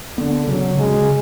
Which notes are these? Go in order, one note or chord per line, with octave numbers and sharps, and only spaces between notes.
D3 B3
C#3 F#3
C#3 G#3